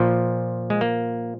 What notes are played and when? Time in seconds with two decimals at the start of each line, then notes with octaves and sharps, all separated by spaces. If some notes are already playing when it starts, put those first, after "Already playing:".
Already playing: A#2 F3
0.70 G#3
0.81 A#3